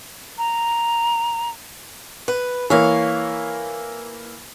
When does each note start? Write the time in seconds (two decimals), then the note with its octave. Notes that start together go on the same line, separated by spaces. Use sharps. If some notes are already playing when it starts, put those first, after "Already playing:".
0.38 A#5
2.28 B4
2.70 E3 A#3 C#5 F5